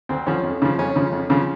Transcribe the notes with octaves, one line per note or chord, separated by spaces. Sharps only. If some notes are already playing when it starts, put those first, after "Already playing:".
D2 C4
D3 F3 C#4
F2
C#3 F3
F2 C#4
C#3 F3
F2
C#3 F3